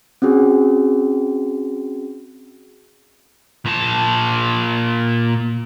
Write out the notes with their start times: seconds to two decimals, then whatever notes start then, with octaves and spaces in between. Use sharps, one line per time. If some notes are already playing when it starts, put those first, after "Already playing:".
0.22 C4 C#4 F#4 G#4
3.66 A#2 A5